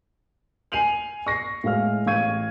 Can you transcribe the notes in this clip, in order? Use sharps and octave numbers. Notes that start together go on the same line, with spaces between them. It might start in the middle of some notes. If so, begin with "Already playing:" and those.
G#5 C7 D#7 F7 F#7
C#6 A#6 C7
A2 G#3 F5 F6
A1 F5 C#6 G#6 D#7